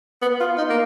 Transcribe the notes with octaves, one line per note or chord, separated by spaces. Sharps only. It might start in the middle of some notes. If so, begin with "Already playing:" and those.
B3
F4
D#4
A#3